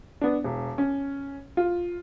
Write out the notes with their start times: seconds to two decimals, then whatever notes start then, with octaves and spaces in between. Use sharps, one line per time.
0.21 B3 D4
0.44 E1
0.78 C#4
1.57 F4